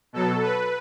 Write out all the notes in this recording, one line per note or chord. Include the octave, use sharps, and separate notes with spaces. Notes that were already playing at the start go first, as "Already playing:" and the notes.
B2 F#3 A4
B4